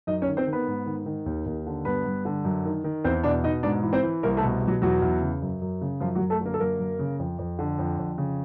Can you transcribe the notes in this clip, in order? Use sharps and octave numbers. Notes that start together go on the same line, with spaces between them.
F#2 D#4 D#5
C#4 C#5
D#3
C4 C5
D#3
B3 B4
G#2
D#3
D#3
D#2
D#2
D3
G2 B3 B4
G2
D3
F#2
D#3
D#3
E2 C4 C5
B2 D4 D5
B2 D#4 D#5
G#2 D4 D5
E3
C4 C5
E3
C2 A#3 A#4
A3 A4
B2
B2
F#3 F#4
E2 F#3 F#4
E2
C#3
F#2
F#2
C#3
F#2 F3 F4
F#3 F#4
F#2
A3 A4
D3 A#3 A#4
A4
F#2 A#3 A#4
F#2
C#3
F2
F2
D3
F2
F2
C#3